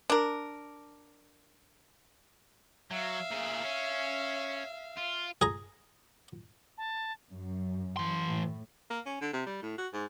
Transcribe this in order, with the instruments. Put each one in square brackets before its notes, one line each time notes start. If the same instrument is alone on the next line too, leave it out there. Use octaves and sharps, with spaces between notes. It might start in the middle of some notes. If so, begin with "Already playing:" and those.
[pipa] D4 A#4
[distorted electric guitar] F#3 [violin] E5 F5
[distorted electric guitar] A#2 G#4
C#4
F4
[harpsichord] G#4 A#5
[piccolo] A5
[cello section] F#2
[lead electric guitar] E3 C6
[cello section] A2
[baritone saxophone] A#3
C#4
D3
C3
G3
A2
F#4
G#2